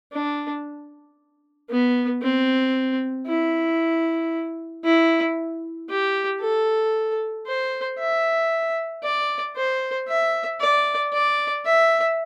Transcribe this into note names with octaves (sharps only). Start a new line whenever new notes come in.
D4
B3
C4
E4
E4
G4
A4
C5
E5
D5
C5
E5
D5
D5
E5